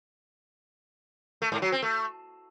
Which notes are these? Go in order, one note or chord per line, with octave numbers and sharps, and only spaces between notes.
A3
G#2
F#3
C4
A3